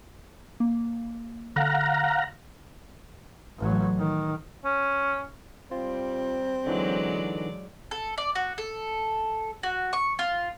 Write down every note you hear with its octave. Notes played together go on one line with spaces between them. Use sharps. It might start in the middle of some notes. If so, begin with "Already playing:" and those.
A#3
D3 F5 F#5 A#5
A1 F#3
D#3
C#4
G3 C4 F4
D3 E3 F#3 G#3 D#4 D5
A4
D5
F#4
A4
F#4
C#6
F4